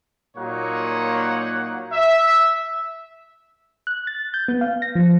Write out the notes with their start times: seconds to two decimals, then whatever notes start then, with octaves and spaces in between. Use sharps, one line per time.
0.36 A#2 F#3 A#3 D#4 C#5 F#5
1.92 E5
3.87 F#6
4.07 A6
4.34 G6
4.48 B3
4.61 F5
4.82 A#6
4.95 F3